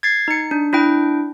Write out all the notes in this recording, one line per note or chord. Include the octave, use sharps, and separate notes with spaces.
G#6 A6 C7
D#4 C#7
D4
D4 E4 G5